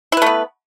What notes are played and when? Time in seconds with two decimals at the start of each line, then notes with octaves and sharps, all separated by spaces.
0.12 E4
0.17 B4
0.22 A3
0.26 B3